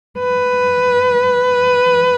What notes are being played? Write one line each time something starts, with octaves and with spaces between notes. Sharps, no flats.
B4